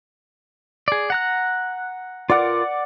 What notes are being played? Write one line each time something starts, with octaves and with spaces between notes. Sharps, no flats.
G#4 D5
F#5 A#5 F#6
F4 A#4 D5 F#5